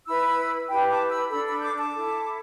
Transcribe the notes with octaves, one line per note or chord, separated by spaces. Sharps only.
E4 B4 B5 E6
E4 G4 B4 G5 B5
A5 D6
B5 E6
D4 A4 B5 E6
B5 E6
E6
D6 G6
A5 D6
E4 A4